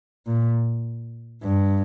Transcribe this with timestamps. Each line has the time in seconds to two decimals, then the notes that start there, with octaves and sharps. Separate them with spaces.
0.27 A#2
1.43 G2